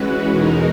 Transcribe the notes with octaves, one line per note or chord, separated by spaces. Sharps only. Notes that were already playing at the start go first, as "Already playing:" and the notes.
Already playing: E3 G#3 C#4 F#4 B4
E2 B2 G#3 D#4 A#4